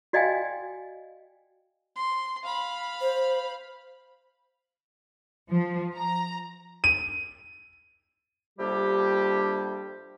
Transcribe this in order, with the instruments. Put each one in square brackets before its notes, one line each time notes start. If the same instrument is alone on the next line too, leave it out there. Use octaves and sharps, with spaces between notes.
[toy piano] F#4 D5 D#5 F5 G5 G#5
[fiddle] C6
F5 B5
[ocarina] C5
[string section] F3
A#5
[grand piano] D#7
[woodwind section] F2 C3 G3 A#3 D4 G4